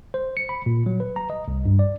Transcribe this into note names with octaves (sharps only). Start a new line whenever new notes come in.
C5
C#7
B5
A#2
F#3
B4
A#5
D#5
C2
G2
D5